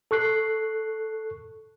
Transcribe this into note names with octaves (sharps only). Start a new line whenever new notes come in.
A4 C#6 F#6 C7